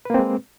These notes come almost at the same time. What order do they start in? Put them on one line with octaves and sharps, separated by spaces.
B4 A#3 C4 G#3